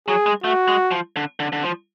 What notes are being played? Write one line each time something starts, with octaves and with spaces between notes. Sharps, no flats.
F#3 G#4
G#3
A3 F#4
G#3
F3
D3
D3
D3
F3